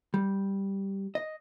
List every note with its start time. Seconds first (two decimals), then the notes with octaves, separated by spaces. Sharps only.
0.14 G3
1.15 D#5